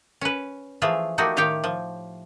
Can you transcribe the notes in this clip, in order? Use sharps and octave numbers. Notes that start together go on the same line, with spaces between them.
C#4 B4
E3 F3 A3 F4 G#4 E5
A3 A#3 D#4 F#4 G4
A2 D#3 G4 C#5 F5 G5
F3